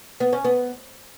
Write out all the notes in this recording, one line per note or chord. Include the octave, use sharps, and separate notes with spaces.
B3
C#4
B3